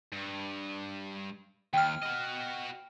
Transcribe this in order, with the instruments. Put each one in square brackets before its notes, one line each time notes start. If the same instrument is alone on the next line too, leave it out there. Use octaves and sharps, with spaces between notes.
[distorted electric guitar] G2
[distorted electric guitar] D#2 [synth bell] G5 F6
[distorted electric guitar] F#4 D#5